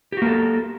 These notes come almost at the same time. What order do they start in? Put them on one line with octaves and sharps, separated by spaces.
G4 F#4 A#3 A4